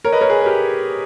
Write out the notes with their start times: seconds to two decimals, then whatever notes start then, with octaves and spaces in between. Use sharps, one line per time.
0.04 A#4 C#5
0.12 B4 D#5
0.21 A#4 C#5
0.30 G#4 B4
0.41 B4
0.46 G4 A#4